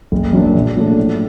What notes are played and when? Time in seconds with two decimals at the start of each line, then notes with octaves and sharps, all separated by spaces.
0.12 F#1
0.33 F#2 F#3 A#3 D4
0.55 A#1
0.76 A#2 F#3 A3 D4
0.98 A2